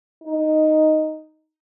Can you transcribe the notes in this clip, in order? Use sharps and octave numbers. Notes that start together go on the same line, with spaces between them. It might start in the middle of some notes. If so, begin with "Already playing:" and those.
D#4